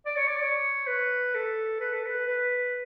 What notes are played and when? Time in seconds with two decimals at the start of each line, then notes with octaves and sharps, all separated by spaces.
0.06 D5
0.16 C#5
0.27 D5
0.42 C#5
0.87 B4
1.35 A4
1.80 B4
1.93 A4
2.06 B4
2.27 B4